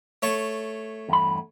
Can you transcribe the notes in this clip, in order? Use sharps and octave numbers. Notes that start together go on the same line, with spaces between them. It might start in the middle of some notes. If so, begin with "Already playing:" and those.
A3 C#5 A5
E2 G2 B5